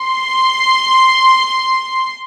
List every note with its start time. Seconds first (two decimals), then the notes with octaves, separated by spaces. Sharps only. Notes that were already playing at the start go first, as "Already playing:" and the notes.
Already playing: C6